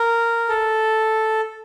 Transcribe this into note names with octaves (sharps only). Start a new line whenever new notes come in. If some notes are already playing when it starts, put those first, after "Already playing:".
Already playing: A#4
A4